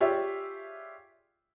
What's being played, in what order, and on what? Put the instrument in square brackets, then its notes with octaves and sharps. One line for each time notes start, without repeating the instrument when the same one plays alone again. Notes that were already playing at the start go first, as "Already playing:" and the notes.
[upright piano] F4 G4 G#4 C#5 D5 E5